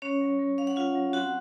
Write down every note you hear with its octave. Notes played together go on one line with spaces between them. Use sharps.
F#3 C#4 C#5
F#3
F#3
C#4 F5
F#5
C#4 F4 F5
F#3
C4 F#4 F#5